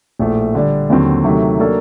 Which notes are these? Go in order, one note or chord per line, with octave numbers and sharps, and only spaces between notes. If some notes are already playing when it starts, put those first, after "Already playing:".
A#1 A2 A3
D3 G3 D4
D#2 D3 F#3 C4
C3 D#3 F#3 A3
F#3 A#3 D4 A4